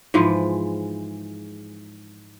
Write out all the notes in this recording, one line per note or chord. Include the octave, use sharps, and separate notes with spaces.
G#2 E3 F3 G#3